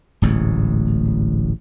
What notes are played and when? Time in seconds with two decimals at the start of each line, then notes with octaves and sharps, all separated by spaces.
0.22 D1 A1 G#2